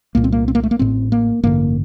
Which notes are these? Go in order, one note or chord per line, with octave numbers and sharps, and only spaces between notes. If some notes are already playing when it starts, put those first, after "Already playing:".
C2 A#2 A#3
C4
A#3
C4
A#3
A3
A#3
A1 A2 C4
A#3
A1 G2 D3 A#3